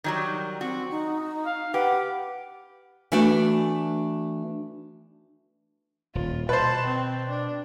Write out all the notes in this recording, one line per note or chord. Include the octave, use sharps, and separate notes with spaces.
D#3 F#3 G3
C4 F#4
D#4
F5
G4 B4 F#5
E3 A3 B3 D4 F#4
D#1 F4
B2 B4 C5 A5
C4
D4